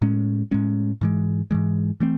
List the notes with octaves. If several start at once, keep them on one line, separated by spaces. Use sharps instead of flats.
A2 G#3 C#4
A2 G#3 C#4
G#2 E3 G#3
G#2 E3 G#3
E3 A3 C4